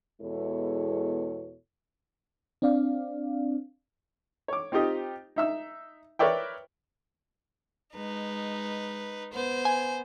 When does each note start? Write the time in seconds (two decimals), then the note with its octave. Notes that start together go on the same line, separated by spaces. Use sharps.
0.21 E2 B2 G#3 E4 A4 C#5
2.62 C4 D4 D5 F5
4.48 C#5 D6
4.72 C4 D#4 F4 G4 D#5
5.36 D#4 E5 E6
6.19 A#4 B4 C#5 D5 E5 G5
7.95 G#3 D#4 B4
9.33 B3 C5
9.65 G#5